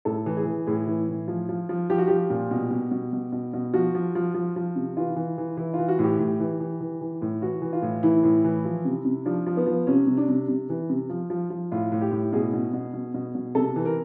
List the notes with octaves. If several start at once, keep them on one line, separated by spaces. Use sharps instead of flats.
A2 A4
E3
G#4
E3
A2 G#4
E3
A2
F3
F3
F3
F3 G4
F#4
F3 G4
A#2
B2
B2
B2
B2
B2
B2
F3 F#4
F3
F3
F3
F3
C3
E3 F4
E3
E3
E3 E4
E3 F4
F#4
A2 G4
A2
E3
E3
E3
E3
A2
E3 F#4
E3
F4
A2
E3 E4
A2
E3
F3
C3
C3
F3 D4
F3
B3
F3
C3 C#4
C3
D4
C3
C3
E3
C3
F3
F3
F3
A2 F4
A2
G4
A2
B2 G#4
B2
B2
B2
B2
B2
C3 A4
E3
A#4